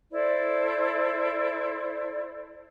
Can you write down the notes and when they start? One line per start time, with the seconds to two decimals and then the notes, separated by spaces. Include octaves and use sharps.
0.11 E4 A4 C5 D5